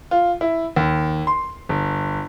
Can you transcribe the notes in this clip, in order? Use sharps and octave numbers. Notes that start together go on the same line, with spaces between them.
F4
E4
D#2
C6
G1